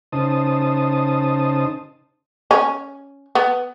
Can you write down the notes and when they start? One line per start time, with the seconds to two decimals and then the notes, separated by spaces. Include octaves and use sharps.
0.12 C#3 D#4 C5 A5 D#6
2.51 C#4
3.35 B3